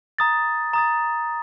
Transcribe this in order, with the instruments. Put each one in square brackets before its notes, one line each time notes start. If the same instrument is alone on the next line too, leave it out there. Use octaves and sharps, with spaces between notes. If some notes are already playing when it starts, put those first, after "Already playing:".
[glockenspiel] A#5 D#6 A6
A#5 D#6 A6